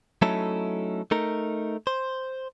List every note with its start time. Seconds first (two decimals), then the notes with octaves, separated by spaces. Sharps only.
0.22 F#3 A3 C#4 D#4 E4 A4
1.11 A3 D#4 A#4
1.87 C5